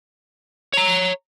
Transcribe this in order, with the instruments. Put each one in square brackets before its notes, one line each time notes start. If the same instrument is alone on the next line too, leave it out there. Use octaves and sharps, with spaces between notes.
[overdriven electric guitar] C#5 A#5